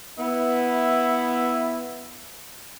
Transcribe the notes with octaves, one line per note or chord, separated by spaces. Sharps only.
B3 E4